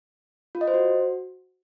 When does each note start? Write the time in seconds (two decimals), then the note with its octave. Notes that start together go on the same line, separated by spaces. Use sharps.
0.55 F4
0.61 D#5
0.67 C5
0.74 F#4